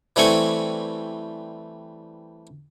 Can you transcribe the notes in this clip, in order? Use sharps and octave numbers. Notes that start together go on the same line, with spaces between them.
E3 G3 A3 C4 G#5 C#6